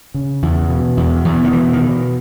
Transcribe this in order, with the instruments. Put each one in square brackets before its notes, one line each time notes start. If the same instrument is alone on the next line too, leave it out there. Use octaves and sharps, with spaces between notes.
[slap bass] C#3
E2
B2
E2
E2
D#3
B2 E3
D#3
B2